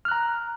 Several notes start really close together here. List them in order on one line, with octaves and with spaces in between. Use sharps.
F6 F#6 A#5